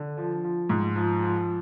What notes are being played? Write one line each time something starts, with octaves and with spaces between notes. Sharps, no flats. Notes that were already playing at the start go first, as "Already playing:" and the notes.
Already playing: D3
F3
F3
G#2
F3
F3